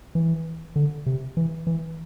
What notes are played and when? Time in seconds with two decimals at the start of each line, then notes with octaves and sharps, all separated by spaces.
0.15 E3
0.76 D3
1.06 C3
1.37 E3
1.67 E3